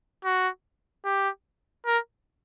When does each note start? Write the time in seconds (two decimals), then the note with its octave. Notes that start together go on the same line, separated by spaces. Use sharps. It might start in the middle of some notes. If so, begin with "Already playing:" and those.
0.25 F#4
1.05 G4
1.86 A#4